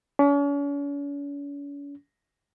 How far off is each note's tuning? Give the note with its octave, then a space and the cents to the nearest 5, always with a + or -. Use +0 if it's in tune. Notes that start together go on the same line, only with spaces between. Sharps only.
C#4 +45